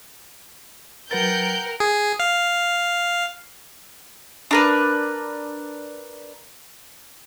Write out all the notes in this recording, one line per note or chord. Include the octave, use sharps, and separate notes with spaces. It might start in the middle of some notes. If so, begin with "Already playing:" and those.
F#3 A#4 B4 F#5 G5 G6 A6
G#4
F5
D4 A#4 B4